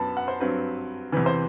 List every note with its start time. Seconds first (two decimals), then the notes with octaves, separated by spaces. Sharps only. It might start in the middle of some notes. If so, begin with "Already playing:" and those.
Already playing: F#2 F#3 B3 A5 B5
0.17 F#5
0.28 C5
0.40 G2 F#3 C4 B4
1.12 E2 C3 E3 B4
1.26 C5